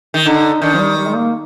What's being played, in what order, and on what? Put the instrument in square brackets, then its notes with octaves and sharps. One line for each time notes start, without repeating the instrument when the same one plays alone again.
[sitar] D#3
[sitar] D3 [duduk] D#4
[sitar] D#3 [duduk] D4
[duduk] F3
G3
G3
G#3
A#3